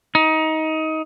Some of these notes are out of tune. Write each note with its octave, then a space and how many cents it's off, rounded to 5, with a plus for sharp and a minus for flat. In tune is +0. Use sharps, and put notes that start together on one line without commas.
D#4 +20